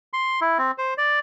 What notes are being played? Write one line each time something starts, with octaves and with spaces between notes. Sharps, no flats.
C6
E4
C4
C5
D5